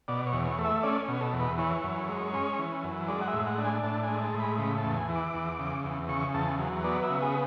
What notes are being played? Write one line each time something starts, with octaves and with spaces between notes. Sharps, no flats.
B2 D5
C#5
E2
C#5
A3
E5
C#4 D5
B2
A4
E2
B4
E3 C#5
F#2
G#3
C#4
E3
F#2
G#3 D5
F#5
E5
A2
F#5
D4
G#5
A2 A5
G#5
G#3
A5
A2
B5
C#3 B5
A5
E2
G#5
E3
D6
E2
C#3
E2
C#3 C#6
E2 A5
F#3
B3 D5
E5
C#3
G#4